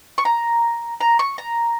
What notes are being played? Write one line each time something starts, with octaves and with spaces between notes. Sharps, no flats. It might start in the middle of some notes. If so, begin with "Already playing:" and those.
C#6
A#5
A#5
C#6
A#5